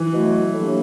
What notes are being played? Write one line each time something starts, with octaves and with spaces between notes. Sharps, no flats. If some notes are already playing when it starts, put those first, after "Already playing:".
Already playing: E3
B2 F#3 A3
A2 F#3 A#3 D4 G4